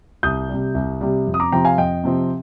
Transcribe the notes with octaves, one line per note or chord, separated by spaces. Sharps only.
C2 D#6 G6
C3 G3
C2
C3 G3
F2
D#6
A#5 D6
C3 F3 C4 G5 A#5
F5 G#5
F2 D#5 G5
C3 F3 C4